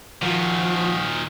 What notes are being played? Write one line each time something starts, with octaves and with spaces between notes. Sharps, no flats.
A#2 D#3 F3 F#4